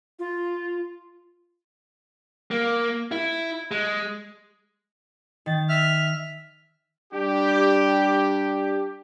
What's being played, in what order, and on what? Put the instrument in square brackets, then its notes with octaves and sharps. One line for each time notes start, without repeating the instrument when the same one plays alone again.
[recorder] F4
[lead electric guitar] A#3
E4
G#3
[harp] D#3 A6
[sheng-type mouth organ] E5 F6
[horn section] G3 D4 G4